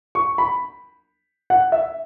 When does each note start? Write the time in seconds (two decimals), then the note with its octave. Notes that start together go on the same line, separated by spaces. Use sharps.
0.15 C#6
0.38 B5
1.50 F#5
1.72 E5